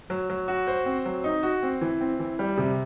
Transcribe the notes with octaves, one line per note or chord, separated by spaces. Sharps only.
F#3
F#3
F#4
C5
C4
F#3
D#4
F#4
C4
E3
C4
E3
G3
C3